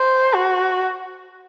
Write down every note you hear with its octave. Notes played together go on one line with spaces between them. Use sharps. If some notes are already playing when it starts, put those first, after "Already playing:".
Already playing: C5
F#4